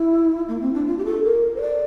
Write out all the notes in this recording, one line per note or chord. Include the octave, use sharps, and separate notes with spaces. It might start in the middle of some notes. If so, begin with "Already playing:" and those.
Already playing: E4
A#3
C4
D4
F4
G4
A4
A#4
C5
D5